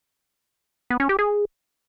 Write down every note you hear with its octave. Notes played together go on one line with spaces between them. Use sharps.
B3
C#4
G4
G#4